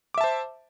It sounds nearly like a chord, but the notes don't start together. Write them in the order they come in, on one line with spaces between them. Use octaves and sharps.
D6 E5 A5 C5